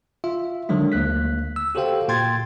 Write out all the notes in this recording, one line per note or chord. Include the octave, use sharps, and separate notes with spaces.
F4 E5
D3 D#3 F#3 G#3 D4
D2 A#3 F#6 B6
E6
F#4 G4 A4 C5 F5 G5
A#2 G5 C6 G#6 A6